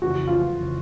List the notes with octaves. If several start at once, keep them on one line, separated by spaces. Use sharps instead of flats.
F2 C#3 E3 F#4
F4
F2 C#3 E3